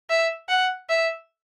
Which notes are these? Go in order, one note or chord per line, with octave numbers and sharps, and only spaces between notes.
E5
F#5
E5